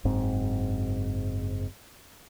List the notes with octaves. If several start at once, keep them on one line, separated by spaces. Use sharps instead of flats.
F#1 G#2 C4